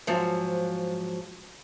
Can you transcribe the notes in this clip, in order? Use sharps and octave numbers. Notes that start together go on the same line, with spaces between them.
G#2 F3 F#3